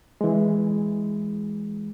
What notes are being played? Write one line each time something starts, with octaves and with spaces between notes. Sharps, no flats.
E3 G#3